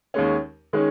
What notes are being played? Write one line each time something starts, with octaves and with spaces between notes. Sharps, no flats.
D#2 D#3 G#3 C#4
D#3 G#3 C#4